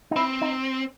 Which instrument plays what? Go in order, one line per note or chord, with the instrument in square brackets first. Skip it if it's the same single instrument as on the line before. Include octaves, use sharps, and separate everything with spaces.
[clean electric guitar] D#4
[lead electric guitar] C4 [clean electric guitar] E4
[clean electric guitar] D#4